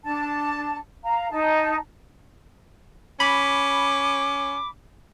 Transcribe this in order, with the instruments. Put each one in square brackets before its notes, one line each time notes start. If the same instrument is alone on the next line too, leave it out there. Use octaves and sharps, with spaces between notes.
[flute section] D4 A5
F5 A#5
D#4 A5
[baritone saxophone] C#4 [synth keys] B5 [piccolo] D6